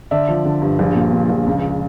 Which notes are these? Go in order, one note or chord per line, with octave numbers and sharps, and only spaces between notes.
D3 D5 E5
F3
D3
G2
A#1
A#2
A#2
A#1
C#2